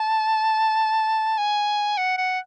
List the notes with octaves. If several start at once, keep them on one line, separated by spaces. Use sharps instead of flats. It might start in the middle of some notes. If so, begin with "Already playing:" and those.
Already playing: A5
G#5
F#5
F#5